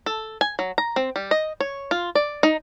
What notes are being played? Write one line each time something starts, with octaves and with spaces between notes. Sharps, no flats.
A4
G#5
F#3
A#5
C4
G3
D#5
C#5
F4
D5
D#4